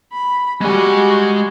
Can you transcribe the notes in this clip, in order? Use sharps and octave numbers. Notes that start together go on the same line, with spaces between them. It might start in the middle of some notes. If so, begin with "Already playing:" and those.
B5
G3 G#3 F#4 G#5